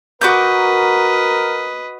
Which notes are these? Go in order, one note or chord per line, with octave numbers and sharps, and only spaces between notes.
F#4 A#4 B4 D#5 D6 G6